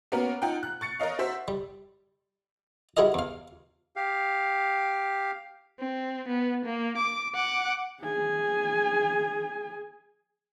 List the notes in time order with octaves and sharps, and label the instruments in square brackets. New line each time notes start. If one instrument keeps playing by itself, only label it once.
[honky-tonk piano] A#3 B3 C#4 F#4 A#4
D#4 F4 F#5 G5
F#6
C#6 A6 C#7
A#4 C#5 D#5 F5
F#4 C5 E5
[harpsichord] G3
G3 E4 F#4 G#4 A#4 D#5
E2 F5
[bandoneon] G4 F5
[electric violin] C4
B3
A#3
D6
F#5 D6
[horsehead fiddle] G#4 G#5